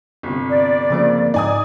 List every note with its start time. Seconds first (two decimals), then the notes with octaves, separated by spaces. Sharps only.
0.23 G1 C3
0.49 D5
0.90 C#3 F3 A#3
1.34 G#2 D#4 D5 G#5 D#6